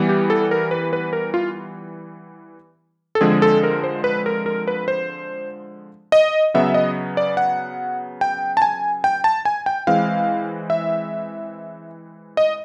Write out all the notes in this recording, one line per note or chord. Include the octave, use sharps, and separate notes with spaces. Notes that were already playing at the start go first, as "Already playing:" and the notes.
Already playing: E3 G3 B3
G4
A4
A#4
B4
B4
A#4
F4
A4
D3 F3 G#3 C4 G#4
A4
A#4
C5
B4
A#4
A#4
B4
C5
D#5
C#3 F#3 B3 E5
D#5
D5
F#5
G5
A5
G#5
G5
A5
G#5
G5
E3 G#3 C4 F5
E5
D#5